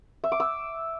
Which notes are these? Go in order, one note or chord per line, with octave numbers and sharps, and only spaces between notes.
E5
D6
E6